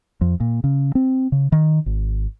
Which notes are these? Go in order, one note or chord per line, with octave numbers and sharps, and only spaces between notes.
F2
A#2
C#3
C4
C#3
D#3
G#1